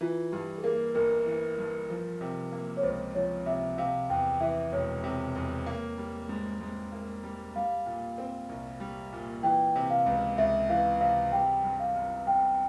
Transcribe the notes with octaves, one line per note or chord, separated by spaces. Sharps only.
E3 F4
G2 G4
G#4
A#3 A#4
G1 A#4
E3
G2
F3
C3
A#3
C#5
C#2 C5
F3 C#5
C3 E5
C3 F5
E2 G5
E3 E5
E1 C#5
C3
E2
A#3
G3
G#2
G#2
A#3
G3
G3 F5
A#2
C4
C2
G3
A#2
E3 G5
C3
F5
C#2
C#2 E5
E3 F5
C3 F5
G3 G5
G2
F5
G1
G1 G5